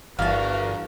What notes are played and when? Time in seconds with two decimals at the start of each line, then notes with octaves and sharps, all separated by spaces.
0.19 G1 E2 G3 F#4 A#4 F5 A5